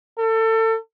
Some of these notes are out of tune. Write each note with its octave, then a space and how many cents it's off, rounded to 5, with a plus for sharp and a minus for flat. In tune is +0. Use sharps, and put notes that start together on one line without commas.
A4 +30